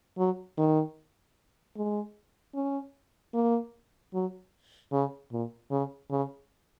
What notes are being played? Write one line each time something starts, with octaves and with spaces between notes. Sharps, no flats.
F#3
D#3
G#3
C#4
A#3
F#3
C#3
A#2
C#3
C#3